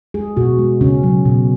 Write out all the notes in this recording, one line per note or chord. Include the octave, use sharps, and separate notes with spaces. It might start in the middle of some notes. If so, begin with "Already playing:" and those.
G#3 G#4
B2 F#4
G#3
C#3 C#4
F#3
B2